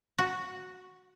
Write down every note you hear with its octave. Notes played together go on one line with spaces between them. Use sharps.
F#4